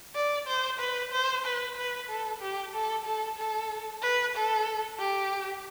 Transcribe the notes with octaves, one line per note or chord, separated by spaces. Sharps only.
D5
C5
B4
C5
B4
B4
A4
G4
A4
A4
A4
B4
A4
G4